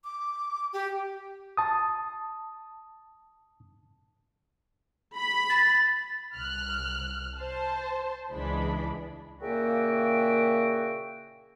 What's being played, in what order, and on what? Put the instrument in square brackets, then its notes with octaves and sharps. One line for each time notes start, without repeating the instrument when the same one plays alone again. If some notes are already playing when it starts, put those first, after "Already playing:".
[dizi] D6
G4
[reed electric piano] A5 D#6
[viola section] B5
[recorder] A6
[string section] C2 F6 F#6
C5 A5
C#2 E3 G#3 D4 B5
[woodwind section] A#2 C#3 A#3 F#4 E5 G5